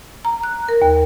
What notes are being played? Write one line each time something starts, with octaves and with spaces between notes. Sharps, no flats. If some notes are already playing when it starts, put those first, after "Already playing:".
A#5
F#6
A#4
D#2